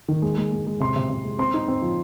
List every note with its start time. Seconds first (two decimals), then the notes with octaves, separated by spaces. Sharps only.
0.08 D#3
0.22 G#3
0.37 G#3
0.52 G#3
0.67 G#3
0.80 C3 C6
0.96 C3
1.09 C3
1.24 G#3
1.39 C4 C6
1.54 D#4
1.68 C4
1.82 F3